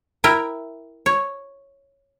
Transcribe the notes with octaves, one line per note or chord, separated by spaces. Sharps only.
E4 A#4 E5 G5
C#5